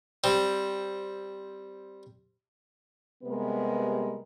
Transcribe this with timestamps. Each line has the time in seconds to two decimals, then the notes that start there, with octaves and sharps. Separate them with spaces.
0.24 G3 C4
3.24 C3 G3 G#3 B3 A#4 B4